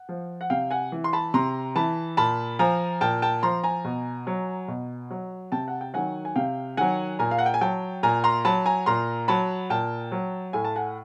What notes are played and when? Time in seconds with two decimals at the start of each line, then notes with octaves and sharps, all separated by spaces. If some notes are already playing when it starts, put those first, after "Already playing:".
Already playing: F#5
0.09 F3
0.41 F#5
0.50 C3 F5 G5
0.71 F#5 G#5
0.92 E3
1.04 C6
1.13 A5 B5
1.34 C3 A#5 C6
1.76 E3 A5 B5
2.17 A#2 A5 B5
2.59 F3 G#5 A#5
3.01 A#2 G5 A5
3.22 G5 A5
3.43 F3 A#5 C6
3.63 G#5 A#5
3.85 B2
4.27 F#3
4.68 B2
5.10 F#3
5.52 C3 G5 A5
5.68 F#5
5.81 G5
5.93 D#3 F#3 F#5 G#5
6.25 G#5
6.36 C3 F5 G5
6.77 D#3 F#3 F#5 G#5
7.19 A#2 G#5 A#5
7.31 F5
7.38 F#5
7.46 G5
7.54 G#5
7.61 F#3 G5 A5
8.03 A#2 G#5 A#5
8.24 A#5 C6
8.45 F#3 A5 B5
8.66 G#5 A#5
8.86 A#2 A#5 C6
9.28 F#3 A5 B5
9.70 A#2 G5 A5
10.12 F#3
10.53 A2 G#5
10.64 A5
10.76 F#5 G#5